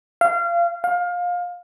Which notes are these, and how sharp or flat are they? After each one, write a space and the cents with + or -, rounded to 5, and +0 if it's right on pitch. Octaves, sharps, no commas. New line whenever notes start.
F5 -25
F5 +25